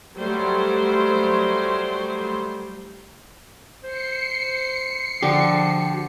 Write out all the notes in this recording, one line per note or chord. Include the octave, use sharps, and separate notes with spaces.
F#3 G3 A3 C5
C5 C7 C#7
D3 F3 F#4 G4